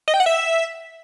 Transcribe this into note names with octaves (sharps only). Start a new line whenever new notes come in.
D#5
G5
F#5
E5